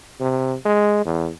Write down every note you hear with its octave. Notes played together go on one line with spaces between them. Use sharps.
C3
G#3
E2